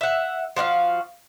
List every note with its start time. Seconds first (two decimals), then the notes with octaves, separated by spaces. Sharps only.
0.01 E5 F#5
0.56 F3 F#4 D5 F5